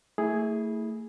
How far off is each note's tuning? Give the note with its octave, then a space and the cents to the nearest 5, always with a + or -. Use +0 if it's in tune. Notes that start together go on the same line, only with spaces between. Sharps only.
A3 +35 E4 -15 G#4 +0